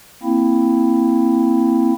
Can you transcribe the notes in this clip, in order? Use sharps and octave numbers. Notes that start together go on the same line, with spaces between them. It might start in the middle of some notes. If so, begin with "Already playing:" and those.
A#3 C4 E4